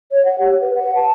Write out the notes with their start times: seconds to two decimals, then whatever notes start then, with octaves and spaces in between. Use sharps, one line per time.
0.11 C#5
0.25 F#5
0.39 G4
0.61 B4
0.75 F#5
0.95 A5